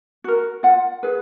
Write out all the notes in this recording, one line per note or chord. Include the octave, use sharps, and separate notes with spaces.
F#4 A#4
F4 F#5
G#4 B4